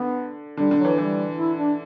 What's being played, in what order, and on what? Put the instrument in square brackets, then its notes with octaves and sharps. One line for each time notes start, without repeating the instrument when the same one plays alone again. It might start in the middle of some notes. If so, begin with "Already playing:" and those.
Already playing: [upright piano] D3 [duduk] B3
[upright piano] D3 [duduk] G3
[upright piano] D3
[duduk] F#3
[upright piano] E3
[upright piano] E3 [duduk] G3
[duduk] E4
D4